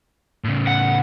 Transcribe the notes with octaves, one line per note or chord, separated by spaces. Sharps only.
A2 C#3
F#5